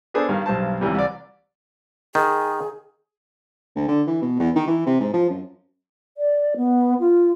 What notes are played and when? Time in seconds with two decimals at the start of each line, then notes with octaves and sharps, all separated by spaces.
0.14 B3 D4 G#4 A4 B4 C5
0.29 G2 D#3 F5
0.46 B1 G2 C5 A5
0.81 C#2 C3 E3 G3
0.95 C2 D5
2.15 D#3 G#4
3.76 D2
3.88 D3
4.07 E3
4.22 B2
4.40 E2
4.55 D#3
4.67 E3
4.87 C3
5.00 G#2
5.14 F3
5.30 F#2
6.17 D5
6.57 B3
7.00 F4